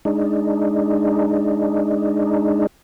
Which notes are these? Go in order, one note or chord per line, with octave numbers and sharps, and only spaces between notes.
G#3 D4 D#4